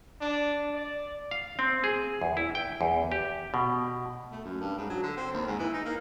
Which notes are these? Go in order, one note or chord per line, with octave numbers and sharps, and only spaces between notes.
D4
D5
F5
C4
G#4
E2
E4
G5
E2
G4
B2
A3
F#2
G2
G#2
F#3
D3
C4
D#2
G#2
E3
D#4
A#3